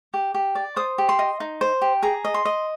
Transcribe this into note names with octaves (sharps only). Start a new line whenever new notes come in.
G4
G4
D5
C5 D#6
G4
C6
D#5
D#4
C5
G4
G#4 A#5
D#5
C6
D#5